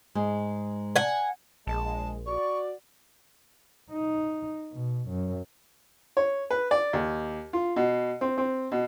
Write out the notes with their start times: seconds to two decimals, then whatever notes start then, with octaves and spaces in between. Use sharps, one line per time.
0.15 G#2 G#3
0.96 F#5 G#5
1.67 A#1 G#3 A5
2.26 F#4 D5 C#6
3.92 D#4
4.73 B2
5.09 F#2
6.17 C#5
6.51 B4
6.71 D5
6.93 D#2
7.53 F4
7.76 B2
8.21 C4
8.38 C4
8.72 B2